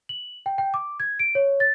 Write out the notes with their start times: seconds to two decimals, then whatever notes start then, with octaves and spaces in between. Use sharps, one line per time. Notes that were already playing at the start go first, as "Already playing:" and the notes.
0.09 F#7
0.46 G5
0.58 G5
0.74 D6
1.00 G#6
1.19 D7
1.35 C#5
1.60 A6